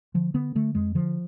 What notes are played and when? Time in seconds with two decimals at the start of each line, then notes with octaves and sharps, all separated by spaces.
0.14 D3 F3
0.34 D3 B3
0.55 D3 A3
0.75 F2 G#3
0.95 D3 F3